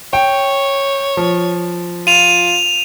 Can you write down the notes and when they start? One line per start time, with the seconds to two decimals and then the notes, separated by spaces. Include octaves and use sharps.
0.13 C#5 G5
1.17 F3
2.07 F4 D#7 F7